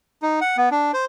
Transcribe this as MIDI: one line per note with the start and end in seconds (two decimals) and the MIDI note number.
0.22 0.40 63
0.41 0.57 78
0.57 0.69 59
0.71 0.92 62
0.94 1.05 72